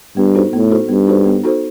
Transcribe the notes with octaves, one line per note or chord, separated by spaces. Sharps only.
G2 B3
D#4 F#4 A4 C5
A2 B3
D#4 F#4 A4 C5
G2 B3
D#4 F#4 A4 C5
B3
D#4 F#4 A4 C5